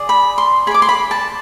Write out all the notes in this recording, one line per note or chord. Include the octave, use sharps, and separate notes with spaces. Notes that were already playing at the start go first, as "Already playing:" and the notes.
Already playing: G#4 D5
B5
C6
G#4 D5 B5 D6
C6
B5
A5